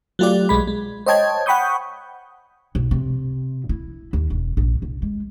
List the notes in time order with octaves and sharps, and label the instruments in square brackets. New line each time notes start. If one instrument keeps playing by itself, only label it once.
[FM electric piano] F#3 A3 F4 G4 D5
B1 G#3 B5
G#3
C5 C#5 D#5 G5 A5 G#6
F#5 G5 B5 C#6 D#6 G6
[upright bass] B1
C3
E4
D#2
E1
A#1
C2
G#3